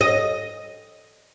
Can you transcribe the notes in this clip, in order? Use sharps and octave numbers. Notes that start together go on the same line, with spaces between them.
D#5